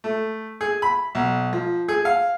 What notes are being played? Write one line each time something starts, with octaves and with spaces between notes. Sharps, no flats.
A3
G#4
B5
B1
F3
G#4
F5